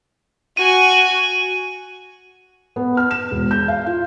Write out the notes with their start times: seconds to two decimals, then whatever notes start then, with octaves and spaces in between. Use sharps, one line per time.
0.57 F#4 G#5 D#7
2.76 B3
2.97 F6
3.11 E7
3.31 E1
3.51 G6
3.68 F5
3.86 F4